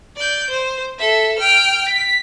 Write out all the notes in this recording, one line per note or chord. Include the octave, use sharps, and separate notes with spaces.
D5 G6
C5
A4 E5
G5 F6
B6